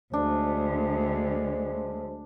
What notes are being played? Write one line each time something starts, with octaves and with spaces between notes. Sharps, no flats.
D2 F#3 G#3 D4 C5